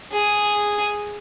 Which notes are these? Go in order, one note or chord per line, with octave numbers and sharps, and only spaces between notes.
G#4